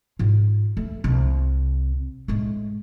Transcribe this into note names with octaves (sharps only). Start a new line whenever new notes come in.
G#2 F4
A3
C2 C3
A2 G#3